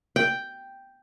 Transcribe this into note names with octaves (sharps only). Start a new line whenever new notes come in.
G5